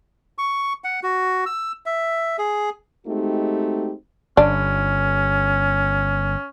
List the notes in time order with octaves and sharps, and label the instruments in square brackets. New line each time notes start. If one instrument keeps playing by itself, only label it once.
[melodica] C#6
F#5
F#4
E6
E5
G#4
[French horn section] G#3 A3 C4 D#4 F#4 G4
[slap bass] G1 [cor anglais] C#4 [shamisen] D4